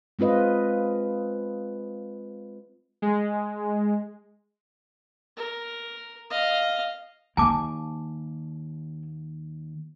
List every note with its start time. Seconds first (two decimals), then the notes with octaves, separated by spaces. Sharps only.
0.19 G#3 C4 F4 B4 D#5
3.02 G#3
5.37 A#4
6.30 D#5 F5
7.37 D#2 G#2 A#3 G#5 A5 D6